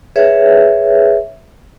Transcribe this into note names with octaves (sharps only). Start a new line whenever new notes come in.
G#4 B4 C#5 E5